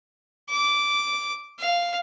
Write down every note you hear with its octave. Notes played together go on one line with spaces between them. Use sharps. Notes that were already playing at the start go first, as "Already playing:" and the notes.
D6
F5